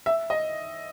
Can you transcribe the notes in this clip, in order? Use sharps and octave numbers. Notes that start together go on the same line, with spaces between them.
E5
D#5